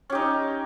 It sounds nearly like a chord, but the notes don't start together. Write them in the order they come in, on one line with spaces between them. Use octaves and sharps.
C#4 G4 D#4